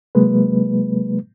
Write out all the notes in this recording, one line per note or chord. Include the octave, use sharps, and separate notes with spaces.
C3 F#3 G#3 A#3 B4